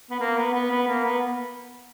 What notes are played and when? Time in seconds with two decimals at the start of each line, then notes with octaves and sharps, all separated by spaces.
0.10 B3
0.20 A#3
0.37 B3
0.54 B3
0.71 B3
0.87 A#3
1.04 B3